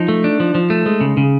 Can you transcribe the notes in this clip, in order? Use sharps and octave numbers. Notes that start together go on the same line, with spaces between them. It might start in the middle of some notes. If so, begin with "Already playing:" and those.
Already playing: F3 D#4
A3
D4
F3
F3
A3
G#3
C#3
C#3